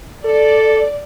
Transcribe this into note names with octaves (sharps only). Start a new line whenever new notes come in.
A4 D5